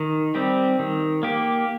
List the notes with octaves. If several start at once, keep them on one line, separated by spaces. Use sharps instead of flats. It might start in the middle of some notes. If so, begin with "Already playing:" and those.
Already playing: D#3
G3 C4 G4
D#3
A#3 G4